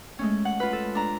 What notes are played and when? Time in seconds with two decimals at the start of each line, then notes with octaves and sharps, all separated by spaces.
0.19 G#3 A3 C#4
0.45 F#5
0.60 F4 B4
0.73 A4
0.95 D4 A#5